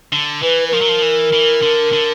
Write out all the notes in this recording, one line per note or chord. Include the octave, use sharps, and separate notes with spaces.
D3
E3 B4
B4
F3 A#4
F#3
F3
E3
E3
D3
D3